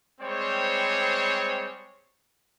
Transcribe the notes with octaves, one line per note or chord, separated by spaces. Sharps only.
G3 G#3 C4 C5 C#5